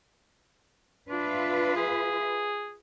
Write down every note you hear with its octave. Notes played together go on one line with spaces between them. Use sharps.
D4 F4 B4 E5
G#4